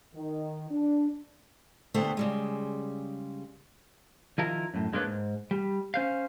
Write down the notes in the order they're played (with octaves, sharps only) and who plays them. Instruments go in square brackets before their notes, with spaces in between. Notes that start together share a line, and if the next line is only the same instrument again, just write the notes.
[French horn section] D#3
D4
[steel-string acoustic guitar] D2 D3 A3 B3 G4 C5
C#3 G3 G#3
[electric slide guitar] D#3 F3 E4 A#4 A#5
F#2 A2
G2 G#3 A#3 D4 B4 C#5
G#2
G3
C#4 C5 F5